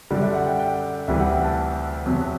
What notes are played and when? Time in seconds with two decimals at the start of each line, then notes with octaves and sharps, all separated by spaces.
0.11 F#2 D3 G3 D5
0.22 E5
0.34 F#5
0.47 G5
0.59 G5
1.07 D2 C3 E3 G3 E5
1.20 F#5
1.32 G5
1.44 A5
2.06 E2 C3 F#3